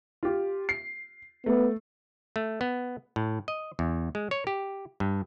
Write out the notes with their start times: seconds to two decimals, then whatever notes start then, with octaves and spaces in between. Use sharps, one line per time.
0.23 F4 G4
0.69 C7
1.46 A3 B3
2.36 A3
2.61 B3
3.16 A2
3.48 D#5
3.79 E2
4.15 G#3
4.31 C#5
4.47 G4
5.00 G2